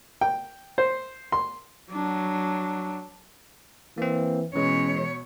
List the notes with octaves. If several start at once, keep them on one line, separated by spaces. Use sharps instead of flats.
G5
C5
C6
F#3 D4
E3 A#3 C4
B2 E3 G#3 C#4 C#5